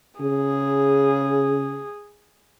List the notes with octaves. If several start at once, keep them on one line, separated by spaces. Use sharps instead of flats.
C#3 G#4